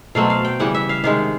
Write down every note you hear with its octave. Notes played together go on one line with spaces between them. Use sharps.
B2 F#3 A3 C4 F5
F5
G5
C#3 E3 G3 F#5
E5
F5
C3 D#3 G#3 F5